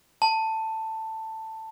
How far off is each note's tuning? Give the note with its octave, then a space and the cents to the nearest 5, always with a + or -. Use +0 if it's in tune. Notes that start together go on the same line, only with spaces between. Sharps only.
A5 +10